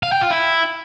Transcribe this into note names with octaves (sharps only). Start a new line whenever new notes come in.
F5
G5
F4
E4